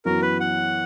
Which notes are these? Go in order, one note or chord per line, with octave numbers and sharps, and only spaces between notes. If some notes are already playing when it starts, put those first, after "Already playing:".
F#2 E3 B3 F#4 A#4
B4
F#5